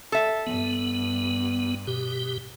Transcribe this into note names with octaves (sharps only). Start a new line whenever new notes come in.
A4 E5
G2 B3
B2 G4